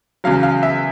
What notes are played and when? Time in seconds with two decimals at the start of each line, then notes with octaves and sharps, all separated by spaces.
0.24 E2 C#3 F#3 F5
0.43 F5
0.63 E5